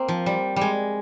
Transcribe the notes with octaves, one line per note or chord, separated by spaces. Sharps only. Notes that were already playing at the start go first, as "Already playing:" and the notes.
Already playing: A#3 C4
F3
G3
G3 G#3